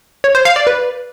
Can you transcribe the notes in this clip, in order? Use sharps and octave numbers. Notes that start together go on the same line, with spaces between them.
C#5
C5
F5
D5
B4